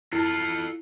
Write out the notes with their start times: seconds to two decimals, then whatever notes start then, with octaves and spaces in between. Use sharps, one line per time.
0.13 E4 F4 A4